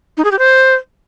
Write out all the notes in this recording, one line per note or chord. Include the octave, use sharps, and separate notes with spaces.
D#4
G#4
G4
C5